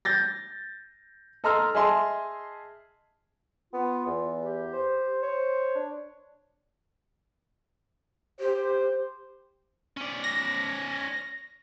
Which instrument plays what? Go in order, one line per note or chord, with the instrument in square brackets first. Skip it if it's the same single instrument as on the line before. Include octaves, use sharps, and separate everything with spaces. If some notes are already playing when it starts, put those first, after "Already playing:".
[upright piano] G6 A6 A#6
A4 D#5 A#5 C6 E6 F6
G#4 D#5 E5 A5 C6
[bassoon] B3 [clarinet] F4
[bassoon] E2
[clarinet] G4
[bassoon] C5
[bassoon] C5 [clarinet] C#5
[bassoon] D4
[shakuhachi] G4 [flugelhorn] C5
[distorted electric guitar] C#4 D5
[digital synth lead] A#6